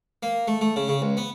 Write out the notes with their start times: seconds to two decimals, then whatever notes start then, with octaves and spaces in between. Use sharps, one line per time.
0.23 A#3
0.48 A3
0.61 A3
0.76 C#3
0.88 C#3
1.02 C#2
1.17 B3